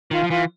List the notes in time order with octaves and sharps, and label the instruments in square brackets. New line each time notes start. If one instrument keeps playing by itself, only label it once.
[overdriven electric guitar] D#3 [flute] F4
[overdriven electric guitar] F3
[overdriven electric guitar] E3 [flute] F4